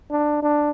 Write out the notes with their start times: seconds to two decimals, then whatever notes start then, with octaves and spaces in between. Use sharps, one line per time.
0.10 D4
0.42 D4